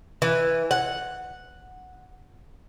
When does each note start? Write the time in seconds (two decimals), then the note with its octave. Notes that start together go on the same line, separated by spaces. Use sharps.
0.22 E3
0.71 F#5